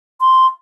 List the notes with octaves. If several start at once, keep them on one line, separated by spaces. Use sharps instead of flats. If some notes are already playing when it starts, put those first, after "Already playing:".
C6